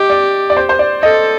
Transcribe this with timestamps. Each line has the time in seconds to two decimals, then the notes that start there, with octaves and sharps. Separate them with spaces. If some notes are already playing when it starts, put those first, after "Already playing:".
Already playing: G4 D#5
0.09 D5
0.50 D5
0.57 C5
0.69 C5
0.79 D5
1.03 A4 D#5